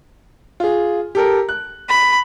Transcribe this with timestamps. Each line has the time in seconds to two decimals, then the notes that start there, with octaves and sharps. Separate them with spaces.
0.60 F4 G#4
1.15 G4 A4 A#4
1.49 F#6
1.89 B5